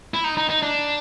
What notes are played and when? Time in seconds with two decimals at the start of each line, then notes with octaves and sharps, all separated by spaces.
0.14 E4
0.24 D#4
0.37 D#4
0.50 D#4
0.63 D4